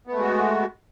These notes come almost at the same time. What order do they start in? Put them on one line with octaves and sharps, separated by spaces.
B3 A3 G#3 F#4